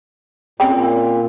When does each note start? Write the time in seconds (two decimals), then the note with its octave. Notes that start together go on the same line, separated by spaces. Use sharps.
0.60 A#2 C4 C#4 G5